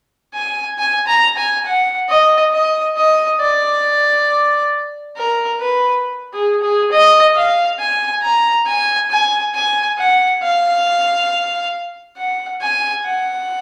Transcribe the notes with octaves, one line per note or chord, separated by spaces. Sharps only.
G#5
G#5
A#5
G#5
F#5
D#5
D#5
D#5
D5
A#4
B4
G#4
G#4
D#5
F5
G#5
A#5
G#5
G#5
G#5
F#5
F5
F#5
G#5
F#5